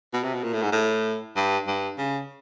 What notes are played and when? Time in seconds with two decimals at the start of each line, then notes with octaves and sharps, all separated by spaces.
0.13 B2
0.23 C3
0.34 B2
0.43 A#2
0.53 A2
0.62 G#2
0.72 A2
1.36 G2
1.67 G2
1.98 C#3